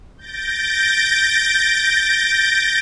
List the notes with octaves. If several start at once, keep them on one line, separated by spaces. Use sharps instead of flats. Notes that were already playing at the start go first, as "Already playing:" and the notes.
G6 A6 A#6 D7